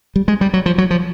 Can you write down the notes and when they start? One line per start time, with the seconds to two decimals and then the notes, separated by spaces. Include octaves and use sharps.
0.16 G3
0.28 G#3
0.41 G3
0.54 F#3
0.66 F3
0.78 F#3
0.91 F3